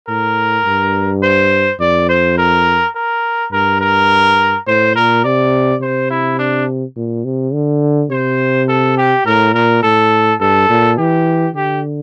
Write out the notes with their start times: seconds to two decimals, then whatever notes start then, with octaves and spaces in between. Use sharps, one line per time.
0.09 A2 A#4
0.66 G2
1.23 C5
1.80 F2 D5
2.09 C5
2.38 A#4
2.95 A#4
3.52 G2 A#4
3.81 A#4
4.67 A2 C5
4.96 A#2 A#4
5.24 C3 D5
5.82 C3 C5
6.10 E4
6.39 D4
6.96 A#2
7.25 C3
7.53 D3
8.10 C3 C5
8.68 A4
8.97 G4
9.26 A2 A#4
9.54 A#2 A#4
9.83 A2 A4
10.40 G2 A4
10.69 A#2
10.97 E3 G4
11.55 D3 G4